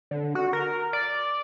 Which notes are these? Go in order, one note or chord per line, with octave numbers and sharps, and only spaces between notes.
D3
F#4
A#4
D5